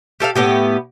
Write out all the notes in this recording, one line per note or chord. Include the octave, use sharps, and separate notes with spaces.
G4 A4 E5 F5
A2 B3 G4